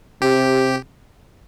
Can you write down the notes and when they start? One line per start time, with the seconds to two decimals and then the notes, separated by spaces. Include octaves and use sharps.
0.22 C3 G4